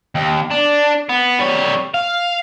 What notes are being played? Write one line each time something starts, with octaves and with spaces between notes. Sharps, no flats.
D#2
D4
B3
G3 C#5
F5